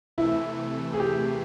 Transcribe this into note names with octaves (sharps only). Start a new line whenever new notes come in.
C3 E3 A3 E4
G#4
G4